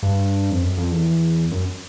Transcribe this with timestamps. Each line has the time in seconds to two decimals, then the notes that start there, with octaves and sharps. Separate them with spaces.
0.03 G2
0.51 F2
0.62 F#2
0.77 F2
0.92 E2
1.51 F#2